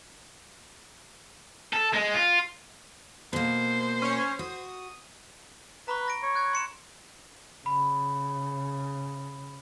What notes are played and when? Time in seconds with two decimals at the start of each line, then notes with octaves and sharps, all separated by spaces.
1.73 A4
1.93 G#3
2.14 F4
3.33 B2 A#3 C5
4.02 C#4 C#5
4.39 F#4 D#6
5.88 B4 A#5 B5 C#6
6.08 A#6 D7
6.23 C#5
6.35 F#6 G#6
6.53 C6 C#7 E7
7.66 C#3 B5